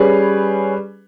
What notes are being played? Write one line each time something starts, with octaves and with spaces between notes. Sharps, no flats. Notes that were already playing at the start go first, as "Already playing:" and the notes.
Already playing: G3 C#4 G#4 B4